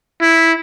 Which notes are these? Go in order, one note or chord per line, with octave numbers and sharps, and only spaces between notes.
E4